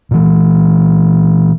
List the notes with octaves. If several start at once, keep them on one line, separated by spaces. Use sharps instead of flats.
A#2 E3